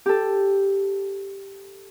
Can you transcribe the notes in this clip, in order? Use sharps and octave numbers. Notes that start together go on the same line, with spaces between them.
G4 A4